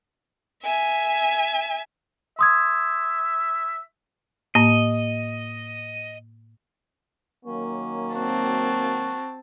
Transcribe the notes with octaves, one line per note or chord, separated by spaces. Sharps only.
E5 G#5
E5 C6 D#6 G#6
A2 A#3 D#5
D#3 F#3 A#3 C#4
C4 F#4 A5